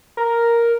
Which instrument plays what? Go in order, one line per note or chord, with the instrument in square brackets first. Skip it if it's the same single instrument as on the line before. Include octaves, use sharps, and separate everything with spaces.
[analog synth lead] A#4